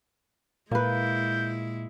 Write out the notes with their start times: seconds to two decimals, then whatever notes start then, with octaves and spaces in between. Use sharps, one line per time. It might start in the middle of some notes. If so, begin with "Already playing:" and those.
0.71 A#2 G#3 A#3 E4 B4 G6